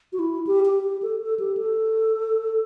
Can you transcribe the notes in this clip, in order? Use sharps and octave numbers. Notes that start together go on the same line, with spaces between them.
F#4
E4
G4
G4
G4
A4
A4
G4
A4